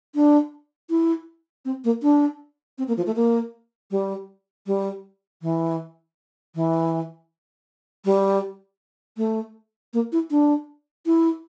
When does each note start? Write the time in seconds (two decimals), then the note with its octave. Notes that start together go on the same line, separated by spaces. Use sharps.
0.15 D4
0.90 E4
1.65 C4
1.84 A#3
2.02 D4
2.78 C4
2.88 A#3
2.97 F3
3.06 A3
3.16 A#3
3.91 G3
4.67 G3
5.42 E3
6.55 E3
8.05 G3
9.17 A3
9.94 A#3
10.12 E4
10.31 D4
11.06 E4